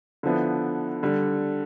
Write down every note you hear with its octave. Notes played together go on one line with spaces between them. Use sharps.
D3 F3 B3 E4
D3 G3